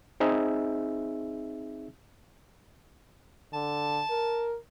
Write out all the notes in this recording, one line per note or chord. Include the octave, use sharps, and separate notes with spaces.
C4 D#4 G#4 E5
D3 A5
A#4